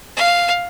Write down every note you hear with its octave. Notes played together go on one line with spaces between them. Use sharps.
F5